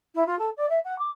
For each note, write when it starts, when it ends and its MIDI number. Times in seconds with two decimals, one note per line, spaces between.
0.15 0.24 64
0.27 0.38 65
0.39 0.50 69
0.57 0.69 74
0.69 0.79 76
0.85 0.98 78
0.99 1.11 86